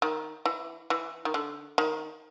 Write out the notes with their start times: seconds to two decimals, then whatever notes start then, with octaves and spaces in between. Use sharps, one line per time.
0.02 D#3
0.46 E3
0.90 E3
1.25 D#3
1.34 D3
1.78 D#3